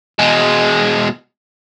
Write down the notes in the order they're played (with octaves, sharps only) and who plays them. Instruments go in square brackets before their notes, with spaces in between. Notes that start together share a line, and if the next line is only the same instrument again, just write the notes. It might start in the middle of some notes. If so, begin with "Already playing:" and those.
[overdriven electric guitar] B2 G#3